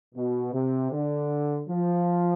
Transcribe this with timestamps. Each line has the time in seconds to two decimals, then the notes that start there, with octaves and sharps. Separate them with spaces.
0.15 B2
0.53 C3
0.91 D3
1.68 F3